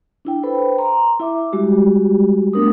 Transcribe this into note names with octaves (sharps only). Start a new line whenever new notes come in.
D4 E4 G5
A4 B4 C5 G5 B5
A#5 C6
E4 E5 D6
G3 G#3 F#4 G4
A3 B3 D4 A#4 D#6